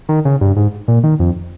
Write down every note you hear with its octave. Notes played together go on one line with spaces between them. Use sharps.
D#3
C#3
G2
G#2
A#2
D#3
F2